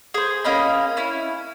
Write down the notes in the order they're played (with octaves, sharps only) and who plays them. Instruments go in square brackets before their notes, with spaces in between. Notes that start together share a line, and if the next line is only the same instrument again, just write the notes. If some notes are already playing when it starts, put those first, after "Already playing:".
[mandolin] G#4 C5
A#3 C#4 D#5 B5
C#4 E4